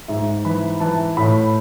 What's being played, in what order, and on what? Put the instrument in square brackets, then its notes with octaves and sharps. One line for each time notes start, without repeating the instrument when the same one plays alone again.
[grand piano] G#2 E5
E3 B5
E3 A5
A2 B5